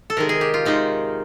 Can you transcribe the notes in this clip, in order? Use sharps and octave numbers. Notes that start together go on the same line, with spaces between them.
A4
C3 D#3 G#3 A#4
G#4
G4
F4
C3 D#3 G#3 D#4